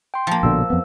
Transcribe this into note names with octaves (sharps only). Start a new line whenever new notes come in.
G5 C6
F3 A#3
A#1 B2 D3 E6
F2 B3